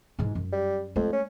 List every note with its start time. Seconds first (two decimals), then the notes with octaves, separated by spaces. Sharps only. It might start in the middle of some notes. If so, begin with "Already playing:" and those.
0.19 G#2 E3
0.35 F#2
0.52 G3
0.96 F2 A3
1.13 C#4